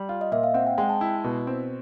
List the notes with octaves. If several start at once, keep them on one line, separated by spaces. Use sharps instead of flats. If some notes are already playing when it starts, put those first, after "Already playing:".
Already playing: G3
F4
D#5
A#2 E5
F5
C4 F#5
G5
G#3 G5
A5
E4
B2
C4